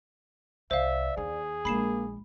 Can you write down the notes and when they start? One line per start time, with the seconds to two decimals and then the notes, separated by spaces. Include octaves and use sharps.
0.71 C2 C5 D5 E5 F5
1.17 D#2 G#4
1.65 A#1 G#3 A#3 B5 C7 E7